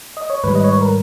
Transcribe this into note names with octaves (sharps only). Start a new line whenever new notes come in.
D#5
C#5
G#2 D#3 G3 B4
D#5
C#5
B4
A#4